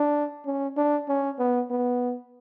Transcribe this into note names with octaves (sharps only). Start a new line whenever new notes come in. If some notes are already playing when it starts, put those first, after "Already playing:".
Already playing: D4
C#4
D4
C#4
B3
B3